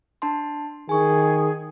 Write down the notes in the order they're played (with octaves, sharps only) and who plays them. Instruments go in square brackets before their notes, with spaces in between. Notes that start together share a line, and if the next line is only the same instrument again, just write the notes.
[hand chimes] D4 A5 C6
[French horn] D#3 [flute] G#4 [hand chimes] G#5 C#6